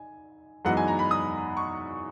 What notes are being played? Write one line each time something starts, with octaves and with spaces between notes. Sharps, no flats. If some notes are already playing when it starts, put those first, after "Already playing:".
Already playing: D#4 G#5
F#2 E3 G#3 B3 D#4 F#5
G#5
A#5
B5
D#6
C#6